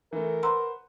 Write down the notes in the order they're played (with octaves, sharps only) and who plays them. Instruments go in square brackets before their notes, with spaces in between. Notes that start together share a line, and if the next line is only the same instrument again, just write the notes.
[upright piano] E3 A3 [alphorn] A#4
[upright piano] B4 C5 F#5 [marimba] A#5 C6 E6